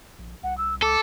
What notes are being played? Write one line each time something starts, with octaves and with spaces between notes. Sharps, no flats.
A#1
C2 F#5
E6
C#2 A4 D6